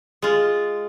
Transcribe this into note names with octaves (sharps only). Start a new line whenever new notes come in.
G#3 F4